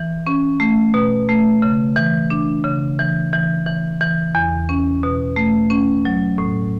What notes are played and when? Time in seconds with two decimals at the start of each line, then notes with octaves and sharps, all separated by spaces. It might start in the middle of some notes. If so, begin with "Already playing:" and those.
Already playing: E3
0.27 C#4
0.60 A3
0.94 B2
1.29 A3
1.62 C#3
1.96 E3
2.30 D4
2.64 C#3
2.99 E3
3.33 E3
3.66 E3
4.01 E3
4.35 E2
4.69 C#4
5.03 B2
5.36 A3
5.70 C#4
6.05 F#3
6.38 A2